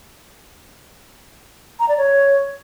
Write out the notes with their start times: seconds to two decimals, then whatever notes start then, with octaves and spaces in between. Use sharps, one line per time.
1.80 A#5
1.89 D5
1.98 C#5